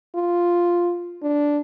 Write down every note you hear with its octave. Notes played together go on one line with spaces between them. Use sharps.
F4
D4